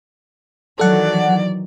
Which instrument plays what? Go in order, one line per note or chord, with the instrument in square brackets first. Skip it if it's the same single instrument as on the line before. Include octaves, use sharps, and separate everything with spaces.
[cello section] D#3 E3 F#3 [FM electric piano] A4 F#5 [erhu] D5